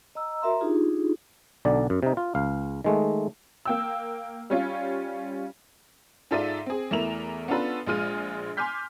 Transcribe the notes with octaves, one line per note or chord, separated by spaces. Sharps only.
D#5 A#5 E6
F#4 A#4 E5 A#5 C6
D4 D#4 F4 G4 G#4
B1 D3 D5
F#2
C3 D#4
F4
C#2 F5
D#3 G#3 A3
A#3 G5 E6
G3 C#4 F4
G#2 F4 A4 D5 E5 D#7
C4 G#4
E2 A3 E4 A#4 E7 F7
B3 C#4 D4 F4 A4 B4
A#1 G#3 F4 G#4 F6 D#7
G#5 C6 D6 F6 G6 B6